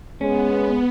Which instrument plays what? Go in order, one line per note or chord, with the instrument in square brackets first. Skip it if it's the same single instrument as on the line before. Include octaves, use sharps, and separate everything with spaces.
[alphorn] G#3 [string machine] B3 [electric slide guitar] C#4